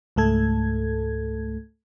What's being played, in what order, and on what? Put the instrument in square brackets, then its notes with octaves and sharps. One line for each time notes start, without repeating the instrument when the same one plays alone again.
[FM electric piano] C#2 G#2 A3 A4 G#6